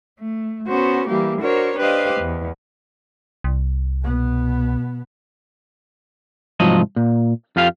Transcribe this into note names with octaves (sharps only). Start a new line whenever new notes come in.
A3
B3 C#4 F#4 C5
E3 G3 A#3 G4
D4 F#4 A#4 C5 C#5
D4 G4 B4 C5 D#5 F5
E2
C2
B2 B3
C2 G#2 F3 F#3 D#5
A#2
F2 F4 G4 F5